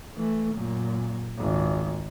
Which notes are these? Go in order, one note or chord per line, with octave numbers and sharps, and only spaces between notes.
E3 A3
F#2 A#2
G#1 C#2